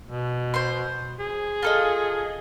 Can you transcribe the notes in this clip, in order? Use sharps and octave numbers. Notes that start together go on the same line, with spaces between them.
B2
C5 C6
G#4
F4 A4 D#5